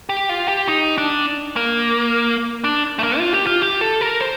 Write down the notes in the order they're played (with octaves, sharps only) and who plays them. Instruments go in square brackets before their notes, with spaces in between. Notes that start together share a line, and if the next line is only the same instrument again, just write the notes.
[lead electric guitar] G4
F4
G4
D#4
D4
A#3
D4
A3
A#3
F4
G4
F4
G4
A4
A#4
C5